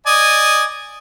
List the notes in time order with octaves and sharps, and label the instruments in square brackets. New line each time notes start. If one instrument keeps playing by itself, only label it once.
[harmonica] D5 D#5 G#5